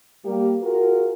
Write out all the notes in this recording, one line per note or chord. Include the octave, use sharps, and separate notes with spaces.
G3 A#3 G4
F4 F#4 G#4 A#4